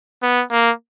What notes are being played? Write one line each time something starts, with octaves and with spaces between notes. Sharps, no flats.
B3
A#3